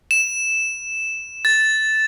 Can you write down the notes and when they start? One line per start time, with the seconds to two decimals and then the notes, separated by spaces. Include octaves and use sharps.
0.11 E7
1.45 A6